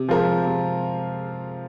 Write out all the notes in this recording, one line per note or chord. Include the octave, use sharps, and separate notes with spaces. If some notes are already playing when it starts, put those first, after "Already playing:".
Already playing: C3
F3 G#3 F4 A#4
C3